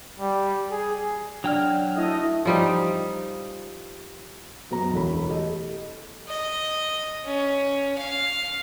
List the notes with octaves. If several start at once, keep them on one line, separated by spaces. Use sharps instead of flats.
G3
G#4
F#3 D4 D5 G5 F6
A3 E4 D#5
F3 G3 D#4
F#2 B2 B3 A#5
E1 A1 D2 C#5 B5
G4 A4 D#5
D#5
C#4
F5